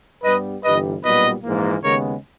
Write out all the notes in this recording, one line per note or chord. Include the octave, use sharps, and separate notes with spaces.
G2 G3 B3 B4 D#5
G1 G2 E3 G3 B4 D#5
B1 A#2 G3 B3 B4 D#5
A#1 G#2 E3 A#3
D#2 C#3 G#3 B3 A#4 C#5